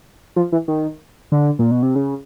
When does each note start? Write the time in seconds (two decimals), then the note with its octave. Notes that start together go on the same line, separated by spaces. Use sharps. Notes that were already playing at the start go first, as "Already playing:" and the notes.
0.36 F3
0.52 E3
0.68 D#3
1.32 D3
1.59 A#2
1.71 B2
1.83 C3
1.96 C#3